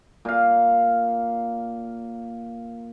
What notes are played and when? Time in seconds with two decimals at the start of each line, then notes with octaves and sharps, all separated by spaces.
0.25 A#2 F5